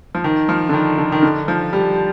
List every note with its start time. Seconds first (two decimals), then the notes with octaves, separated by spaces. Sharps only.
0.15 F3
0.24 D#3
0.49 F3
0.69 D3
0.73 D#3
0.98 D3
1.12 D#3
1.23 D3
1.48 F3
1.73 G3